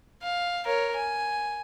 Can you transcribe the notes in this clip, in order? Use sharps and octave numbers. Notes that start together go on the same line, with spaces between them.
F5
A#4 C#5
G#5